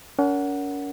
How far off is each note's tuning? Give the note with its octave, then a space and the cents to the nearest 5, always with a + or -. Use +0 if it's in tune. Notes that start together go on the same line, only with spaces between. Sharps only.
C#4 +40 A#4 +0 F#5 +0